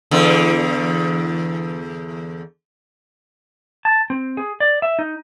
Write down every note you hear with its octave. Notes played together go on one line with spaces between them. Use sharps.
E2 D3
A5
C4
G#4
D5
E5
D#4